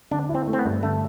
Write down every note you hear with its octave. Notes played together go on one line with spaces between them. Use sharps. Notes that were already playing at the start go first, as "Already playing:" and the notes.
D3 D4
E4
C4
A3
C4
B3
G2
D3 A3